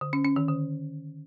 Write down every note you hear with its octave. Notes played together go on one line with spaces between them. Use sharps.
D3
C#4
C#4
D#3
D3